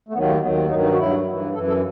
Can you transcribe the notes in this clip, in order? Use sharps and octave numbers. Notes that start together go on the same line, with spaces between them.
A3
D#2 D#3 F#3 B3
A3
D#2 D#3 F#3 B3
C4
G2 D#3 F#3 D#4
D#4
F#4
G2 F#3 E4
G2 E3
F#2 E3 A4
A4